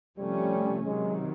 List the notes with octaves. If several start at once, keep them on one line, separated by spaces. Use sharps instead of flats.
C3 F3 G3 A3 C#4
C3 D#3 F#3 G#3